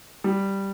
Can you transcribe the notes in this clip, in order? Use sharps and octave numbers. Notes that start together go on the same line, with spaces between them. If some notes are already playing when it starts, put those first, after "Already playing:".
G3